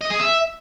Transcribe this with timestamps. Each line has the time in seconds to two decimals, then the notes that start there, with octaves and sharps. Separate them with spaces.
0.01 D#5
0.11 G#4
0.20 E5